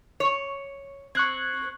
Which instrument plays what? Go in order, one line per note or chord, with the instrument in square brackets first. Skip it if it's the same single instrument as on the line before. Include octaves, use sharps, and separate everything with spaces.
[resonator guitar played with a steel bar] C#5
[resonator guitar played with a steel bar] C4 [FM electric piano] C#6 F#6 G#6